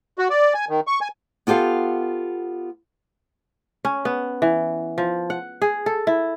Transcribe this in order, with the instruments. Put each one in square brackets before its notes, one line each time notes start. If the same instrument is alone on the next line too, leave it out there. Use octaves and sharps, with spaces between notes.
[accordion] F#4
D5
G#5
D#3
C#6
G#5
[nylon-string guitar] B3 F4 G4 A4 F5
[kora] C#4
B3
E3
F3
F#5
G#4
A4
E4